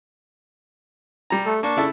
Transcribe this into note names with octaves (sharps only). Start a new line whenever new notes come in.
G3 A#5
A3 A4
A#3 D4 A5 C#6
C#3 E4 A4